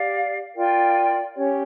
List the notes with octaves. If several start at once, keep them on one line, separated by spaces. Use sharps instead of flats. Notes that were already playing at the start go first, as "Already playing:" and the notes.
Already playing: G4 D5 F5
F4 A#4 D5 G5
C#4 G4 C#5